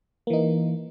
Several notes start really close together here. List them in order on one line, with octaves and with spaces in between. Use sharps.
A#3 E3 D#4